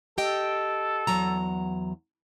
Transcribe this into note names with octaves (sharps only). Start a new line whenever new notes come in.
G4 A4 D#5 G5
E2 F#3 A#5